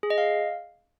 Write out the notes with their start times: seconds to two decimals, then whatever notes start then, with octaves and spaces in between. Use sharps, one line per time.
0.03 G#4
0.10 D#5
0.18 F5